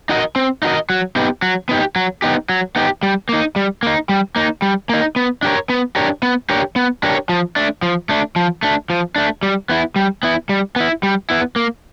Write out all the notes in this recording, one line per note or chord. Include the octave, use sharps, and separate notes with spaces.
D#4 F#4 A#4 D#5
C4
D#4 F#4 A#4 D#5
F#3
B3 D#4 G4
F#3
B3 D#4 G4
F#3
B3 D#4 G4
F#3
B3 D#4 G4
G3
A#3 D#4
G3
A#3 D#4
G3
A#3 D#4
G3
A#3 D#4
B3
D4 G4 A#4 C#5
B3
D4 G4 A#4 C#5
B3
D4 G4 A#4 C#5
B3
D4 G4 A#4 C#5
F3
A3 D4
F3
A3 D4
F3
A3 D4
F3
A3 D4
G3
B3 E4
G3
B3 E4
G3
B3 E4
G3
B3 E4
A#3